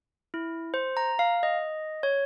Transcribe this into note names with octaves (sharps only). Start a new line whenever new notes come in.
E4
C5
A#5
F5
D#5
C#5